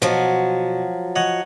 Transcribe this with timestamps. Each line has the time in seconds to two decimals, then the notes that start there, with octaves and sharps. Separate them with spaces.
0.02 B2 F3 F#3
1.16 C#5 D#5 F#5